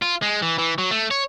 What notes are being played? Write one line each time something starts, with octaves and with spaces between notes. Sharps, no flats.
F4
G#3
E3
E3
F#3
A3
C#5